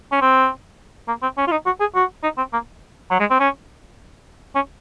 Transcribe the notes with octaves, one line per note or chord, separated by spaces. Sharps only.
C#4
C4
A#3
C4
C#4
F4
D#4
F#4
G#4
F#4
D#4
C4
A#3
F#3
G#3
C4
C#4
C#4